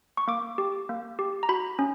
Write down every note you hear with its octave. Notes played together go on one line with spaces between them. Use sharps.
C#6
A#3 D6
G4
A#3
G4
A#5
F#4 B5
C#4